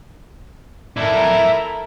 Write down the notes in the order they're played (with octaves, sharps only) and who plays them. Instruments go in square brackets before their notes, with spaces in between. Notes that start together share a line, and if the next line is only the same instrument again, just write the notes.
[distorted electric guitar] E4 D5 [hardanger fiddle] A4 A#4